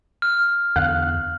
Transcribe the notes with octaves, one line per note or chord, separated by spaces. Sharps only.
F6
E2 D3 F5 F#6